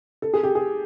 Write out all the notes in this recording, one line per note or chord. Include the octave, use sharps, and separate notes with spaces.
A4
G#4
G4
G#4